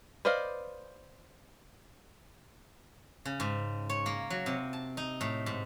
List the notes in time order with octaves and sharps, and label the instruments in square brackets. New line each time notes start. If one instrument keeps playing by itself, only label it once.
[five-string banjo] B4 C5 D5 D#5 F5
[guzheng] C#3
G#2
C#5
A#3
F#3
C3
A5
D#4
A2
G#2